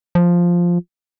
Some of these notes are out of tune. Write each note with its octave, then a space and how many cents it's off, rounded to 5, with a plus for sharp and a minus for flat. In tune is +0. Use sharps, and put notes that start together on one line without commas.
F3 +0